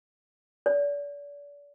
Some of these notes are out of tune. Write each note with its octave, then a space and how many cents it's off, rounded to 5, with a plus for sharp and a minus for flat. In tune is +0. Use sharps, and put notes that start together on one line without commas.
D5 -35